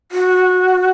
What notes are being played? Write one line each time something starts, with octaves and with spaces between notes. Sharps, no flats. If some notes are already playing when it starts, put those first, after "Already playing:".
F#4